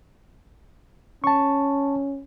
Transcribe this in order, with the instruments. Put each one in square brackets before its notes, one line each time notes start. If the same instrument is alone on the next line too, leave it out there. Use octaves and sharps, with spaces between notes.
[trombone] C#4 [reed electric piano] A5 C#6